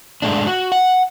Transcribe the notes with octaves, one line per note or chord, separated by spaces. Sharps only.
G#2 G#3 A3 D4
F#4
F#5